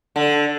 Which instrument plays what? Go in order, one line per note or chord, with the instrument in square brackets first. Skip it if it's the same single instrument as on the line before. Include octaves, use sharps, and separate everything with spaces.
[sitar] D3